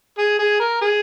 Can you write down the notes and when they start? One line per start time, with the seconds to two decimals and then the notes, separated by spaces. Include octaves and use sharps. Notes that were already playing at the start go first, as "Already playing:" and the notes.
0.18 G#4
0.39 G#4
0.60 A#4
0.81 G#4